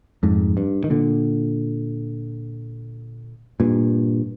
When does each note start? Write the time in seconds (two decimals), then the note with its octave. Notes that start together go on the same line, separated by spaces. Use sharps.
0.23 F2 G#2
0.57 G2
0.84 D#3
0.90 A#2 D3
3.60 G2 A#2